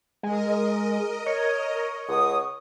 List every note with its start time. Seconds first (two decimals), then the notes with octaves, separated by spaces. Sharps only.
0.23 G#3 A#4 D#5
1.26 C#5
2.09 C#2 F#5 D#6